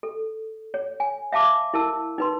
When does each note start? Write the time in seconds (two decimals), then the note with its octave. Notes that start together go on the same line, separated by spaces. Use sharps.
0.03 A4
0.74 C#5
1.00 G#5
1.32 E5 F5 A5 D6
1.74 E4 A#4 A5 E6
2.18 D#4 B4 C6